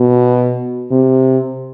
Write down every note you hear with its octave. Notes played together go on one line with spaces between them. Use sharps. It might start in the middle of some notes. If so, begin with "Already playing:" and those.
Already playing: B2
C3